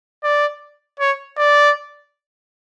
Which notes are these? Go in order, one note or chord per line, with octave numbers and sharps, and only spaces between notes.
D5
C#5
D5